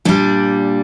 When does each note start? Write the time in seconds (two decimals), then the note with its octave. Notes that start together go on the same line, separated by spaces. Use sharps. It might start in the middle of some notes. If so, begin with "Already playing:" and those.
0.05 A#2 G3 D4